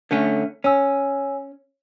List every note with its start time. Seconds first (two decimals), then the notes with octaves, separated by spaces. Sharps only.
0.11 D3 A3 C#4
0.64 C#4 C#5 G#5 E6